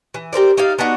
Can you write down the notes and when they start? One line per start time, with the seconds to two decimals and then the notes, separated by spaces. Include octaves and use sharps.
0.14 E3
0.33 G4 A#4 C5 D5
0.57 D#4 G4 D5 F5
0.79 B3 D4 D#4 F#4